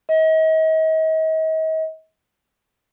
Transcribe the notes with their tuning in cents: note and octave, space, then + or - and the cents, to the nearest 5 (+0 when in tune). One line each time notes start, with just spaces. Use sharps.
D#5 +40